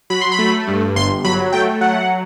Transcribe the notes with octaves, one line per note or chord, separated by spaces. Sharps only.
F#3 B5
C6
B5
A3
G2
G1 C6
F#3 B5
A3 G5
F#3 F#5